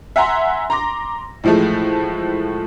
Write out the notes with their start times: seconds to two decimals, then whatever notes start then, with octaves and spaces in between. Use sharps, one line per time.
0.16 E5 F#5 G#5 A#5 C6
0.70 A#5 C6 D6 A#6
1.44 A2 E3 F3 G#3 A3